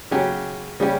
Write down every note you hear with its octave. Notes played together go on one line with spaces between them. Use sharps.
C#3 F#3 C#4 G4
C#3 G3 C#4 G4